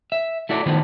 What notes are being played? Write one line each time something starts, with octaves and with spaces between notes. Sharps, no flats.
E5
A3 E4 F#4 D5
A2 D#3 F3 B3 D4 D#4